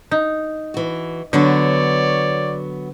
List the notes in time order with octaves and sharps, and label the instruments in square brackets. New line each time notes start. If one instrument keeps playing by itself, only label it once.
[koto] D#4
[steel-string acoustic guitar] E3 F#4
[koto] D3 [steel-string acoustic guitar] F#3 B3 F#4 [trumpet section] C#5 D5